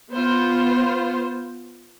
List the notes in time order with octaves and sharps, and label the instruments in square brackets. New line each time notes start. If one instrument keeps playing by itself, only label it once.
[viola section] B3 F4 C5